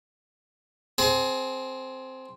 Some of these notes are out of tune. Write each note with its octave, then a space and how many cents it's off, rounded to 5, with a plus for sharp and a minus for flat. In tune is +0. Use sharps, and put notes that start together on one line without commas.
C4 +0 G#4 +30